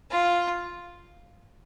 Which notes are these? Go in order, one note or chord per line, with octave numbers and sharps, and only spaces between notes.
F4